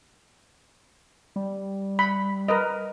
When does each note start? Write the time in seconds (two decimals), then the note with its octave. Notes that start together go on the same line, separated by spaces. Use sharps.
1.36 G3
1.99 B5
2.48 A#4 B4 D#5